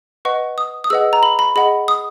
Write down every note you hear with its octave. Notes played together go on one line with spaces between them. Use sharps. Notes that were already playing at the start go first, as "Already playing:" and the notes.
B4 D#5 F#5 C#6
D#6
D#6
G#4 B4 D#5 F#5 E6
A#5
B5
B5
G#4 D#5 F#5 B5
D#6